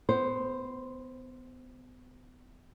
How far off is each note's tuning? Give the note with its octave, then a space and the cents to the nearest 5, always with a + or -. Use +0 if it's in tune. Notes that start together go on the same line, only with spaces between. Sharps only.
B3 +30 C5 +0